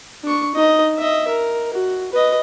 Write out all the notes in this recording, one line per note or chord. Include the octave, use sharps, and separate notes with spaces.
D4 C#6
D#4 D#5
D#5 E5
A#4
F#4
B4 D#5